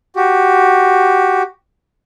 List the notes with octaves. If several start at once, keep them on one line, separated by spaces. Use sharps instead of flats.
F#4 G4